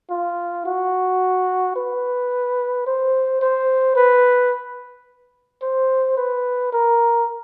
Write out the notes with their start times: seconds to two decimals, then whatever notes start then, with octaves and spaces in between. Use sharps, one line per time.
0.10 F4
0.66 F#4
1.76 B4
2.87 C5
3.42 C5
3.96 B4
5.62 C5
6.17 B4
6.73 A#4